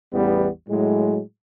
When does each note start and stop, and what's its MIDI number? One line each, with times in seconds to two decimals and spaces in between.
0.13 0.48 33
0.13 0.48 40
0.13 0.48 55
0.13 0.48 59
0.69 1.20 45
0.69 1.20 54
0.69 1.20 56